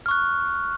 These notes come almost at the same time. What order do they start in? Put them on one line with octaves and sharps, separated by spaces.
F6 C#6 F#6